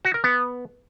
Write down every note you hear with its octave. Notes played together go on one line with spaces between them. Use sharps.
F#4
A#4
B3